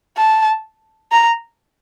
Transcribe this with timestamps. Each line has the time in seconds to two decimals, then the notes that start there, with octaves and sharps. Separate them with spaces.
0.17 A5
1.12 A#5